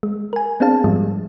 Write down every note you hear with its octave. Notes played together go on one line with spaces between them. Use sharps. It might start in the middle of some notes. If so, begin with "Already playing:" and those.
G#3
A#4 G#5
B3 C4 D4 G#4 F5 A5
G#2 F3 G3 G#3